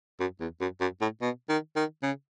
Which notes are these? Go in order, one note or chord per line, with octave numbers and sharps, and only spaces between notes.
F#2
E2
F#2
F#2
A2
B2
D#3
D#3
C#3